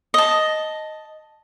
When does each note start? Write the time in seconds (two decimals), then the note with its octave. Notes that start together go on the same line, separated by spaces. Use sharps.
0.14 D#5 A5